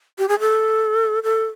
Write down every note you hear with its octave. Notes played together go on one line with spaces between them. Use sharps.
G4
G#4
A4
A4